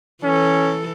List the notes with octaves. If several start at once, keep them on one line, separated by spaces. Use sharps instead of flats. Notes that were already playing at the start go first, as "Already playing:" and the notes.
E3 C#4 A4